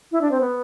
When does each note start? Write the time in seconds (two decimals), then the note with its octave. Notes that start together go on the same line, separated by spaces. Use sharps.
0.12 E4
0.21 D4
0.31 C4
0.41 B3